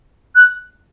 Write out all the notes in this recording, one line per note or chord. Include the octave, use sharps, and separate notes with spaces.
F#6